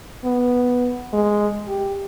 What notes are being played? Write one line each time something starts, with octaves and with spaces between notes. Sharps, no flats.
B3
G#3
G4